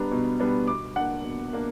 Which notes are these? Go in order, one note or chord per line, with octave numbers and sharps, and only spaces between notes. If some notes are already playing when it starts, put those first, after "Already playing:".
Already playing: G3 B3 D4 A#5
B2
G3 B3 D4
B2 D6
A#3 D4 F#5
B2
A#3 D4